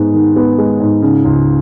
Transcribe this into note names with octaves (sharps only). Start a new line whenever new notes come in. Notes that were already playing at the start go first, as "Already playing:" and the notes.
Already playing: G#2 G#3 B3
D#3
B3
G#3
G#2
C#3
C#2